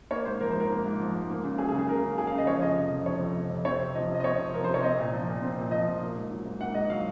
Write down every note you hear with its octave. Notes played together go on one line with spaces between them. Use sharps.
A#3 C#5
G#2 C5
F3 A#4
G#2 C5
A#4
A#3
G#2
F3
G#2
A#3
C#3
F#3 G#4
G#4
C#3
G#4
A#3 A#4
C#3
F#3 G#4
F5
C#3
D#5
F3 C#5
F2 D#5
C3 D#5
F2
F3 C#5
F2
C3
F2
C4 C#5
C3
F3 D#5
C3 D#5
D#5
C4 C#5
C3
F3 A#4
C3 C5
C#5
C4 D#5
A#2
F3
A#2
C4
A#2
F3 D#5
A#2
A#3
G#2
F#3
G#2
A#3 F#5
G#2 D#5
F#3 F5